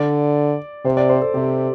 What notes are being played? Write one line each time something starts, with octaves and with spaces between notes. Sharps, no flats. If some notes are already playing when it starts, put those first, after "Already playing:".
Already playing: D3 D5
C3 C5
D5
C5
A4
C3 G4